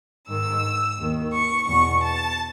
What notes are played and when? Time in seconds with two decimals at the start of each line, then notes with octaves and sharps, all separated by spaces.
0.28 G#2 D#3 E6
0.98 D#2 D#3
1.32 C#6
1.67 E2 B2 C#6
2.02 A5